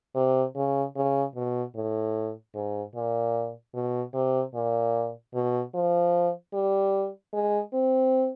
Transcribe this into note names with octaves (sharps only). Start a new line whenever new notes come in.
C3
C#3
C#3
B2
A2
G#2
A#2
B2
C3
A#2
B2
F3
G3
G#3
C4